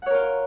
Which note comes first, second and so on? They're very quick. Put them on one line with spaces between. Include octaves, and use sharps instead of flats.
F#5 C#5 A#4 F4